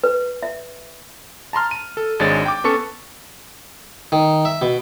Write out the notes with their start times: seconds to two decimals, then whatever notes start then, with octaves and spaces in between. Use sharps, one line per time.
0.04 B4
0.43 E5
1.53 A5 A#5 C6 F6
1.71 D#7
1.97 A4
2.20 G#1 G#3 D4 C#5 A6
2.46 G5 D6
2.64 B3 C#4 A4 A5 C#6 C#7
4.12 D#3
4.45 E5
4.62 B2